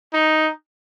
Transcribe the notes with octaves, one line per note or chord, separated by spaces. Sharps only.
D#4